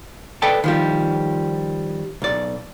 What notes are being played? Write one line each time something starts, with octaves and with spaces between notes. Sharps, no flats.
A4 B4 D5 D#5 G5 A5
D#3 F3 G3
B1 D5